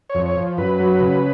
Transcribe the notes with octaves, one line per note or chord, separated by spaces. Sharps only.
C#5
F2
C#5
F3
F#2 B4
F#3
C#3